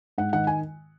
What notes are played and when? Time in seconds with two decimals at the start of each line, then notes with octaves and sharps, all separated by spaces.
0.18 G#2 F#5
0.33 D#3 F#5
0.47 G#5